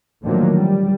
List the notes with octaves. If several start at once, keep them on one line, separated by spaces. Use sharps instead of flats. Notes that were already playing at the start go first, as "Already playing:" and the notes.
A2 D3 D#3 F3 F#3 A#3
G3